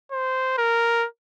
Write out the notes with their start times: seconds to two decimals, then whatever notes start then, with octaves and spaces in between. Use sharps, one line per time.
0.12 C5
0.58 A#4